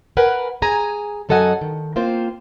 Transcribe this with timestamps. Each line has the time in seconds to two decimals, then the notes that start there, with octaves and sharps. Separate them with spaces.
0.17 A#4 B4 F#5 G#5
0.62 G#4 G#5 A#5
1.29 F#2 F#3 A4 D#5 F#5 G#5
1.61 D#3
1.96 A#3 C4 F4 C5